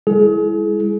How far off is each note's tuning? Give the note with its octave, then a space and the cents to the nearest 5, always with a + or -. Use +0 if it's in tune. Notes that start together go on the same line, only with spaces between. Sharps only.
G#3 -35 E4 +5 G#4 +35